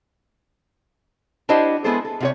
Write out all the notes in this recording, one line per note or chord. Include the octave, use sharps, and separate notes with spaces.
D4 E4 G4 C5 D#5 F#5
G#3 B3 E4 G#4 A4 C5
A4
C3 F#4 C#5